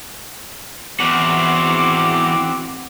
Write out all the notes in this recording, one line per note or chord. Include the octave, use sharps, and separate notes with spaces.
E2 C4 F#4 D6